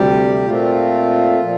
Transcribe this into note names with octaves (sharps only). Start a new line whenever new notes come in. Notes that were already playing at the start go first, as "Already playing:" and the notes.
Already playing: D2 C3 G3 G4
A#2 A3 C4 F4
A#2 F3